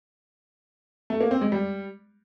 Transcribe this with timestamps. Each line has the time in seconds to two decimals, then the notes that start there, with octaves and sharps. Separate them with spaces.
1.10 A3
1.21 A#3
1.31 C4
1.41 G#3
1.52 G3